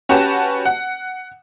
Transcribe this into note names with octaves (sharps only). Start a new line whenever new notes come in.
C#4 F#4 G4 B4 A5
F#5